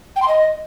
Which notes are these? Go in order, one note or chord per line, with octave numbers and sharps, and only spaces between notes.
G5
C6
D#5